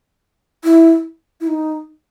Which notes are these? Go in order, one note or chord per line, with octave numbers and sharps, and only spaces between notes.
E4
E4
D#4